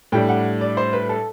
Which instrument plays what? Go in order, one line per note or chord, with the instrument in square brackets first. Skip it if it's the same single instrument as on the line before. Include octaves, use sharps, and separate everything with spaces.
[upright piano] A2 G3 D4 G5
F#5
D5
C5
B4
A4